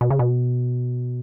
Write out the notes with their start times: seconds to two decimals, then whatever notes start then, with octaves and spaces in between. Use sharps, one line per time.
0.01 B2
0.10 C#3
0.19 B2